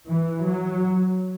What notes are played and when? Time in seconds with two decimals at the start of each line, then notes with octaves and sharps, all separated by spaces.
0.09 E3
0.48 F#3